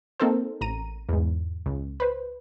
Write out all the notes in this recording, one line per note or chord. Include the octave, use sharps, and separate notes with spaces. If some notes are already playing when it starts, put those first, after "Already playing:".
A#3 C4 D#4 A4 A#4 C5
A1 A#5 D#7
E2 G#2
C#2
B4 C5